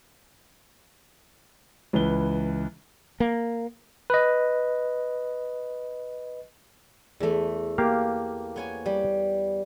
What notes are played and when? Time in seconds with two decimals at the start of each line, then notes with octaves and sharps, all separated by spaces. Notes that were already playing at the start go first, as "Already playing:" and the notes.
1.93 C#2 E3 B4 G7
3.20 A#3
4.10 B4 D#5
7.20 E2 A3
7.78 A#3 G4 F5
8.56 B3 C#5 G#5
8.86 G3